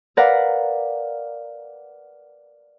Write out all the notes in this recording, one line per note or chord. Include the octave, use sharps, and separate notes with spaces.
A#4 B4 D5 F5 F#5 A#5